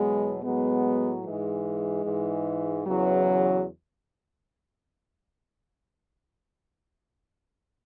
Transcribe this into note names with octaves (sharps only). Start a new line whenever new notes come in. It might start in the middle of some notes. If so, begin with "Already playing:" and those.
Already playing: E2 B2 F#3 G#3 B3
A2 F#3 G#3 B3
G#2 E3 G#3
G#2 E3
E2 C#3 E3 F#3